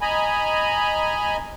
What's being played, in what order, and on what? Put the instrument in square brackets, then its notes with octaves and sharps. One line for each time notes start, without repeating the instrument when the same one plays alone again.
[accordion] D#5 G#5 A#5 B5